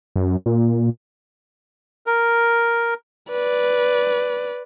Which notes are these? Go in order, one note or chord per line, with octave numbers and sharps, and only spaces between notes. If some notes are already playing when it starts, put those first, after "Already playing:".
F#2
A#2
A#4
B4 D5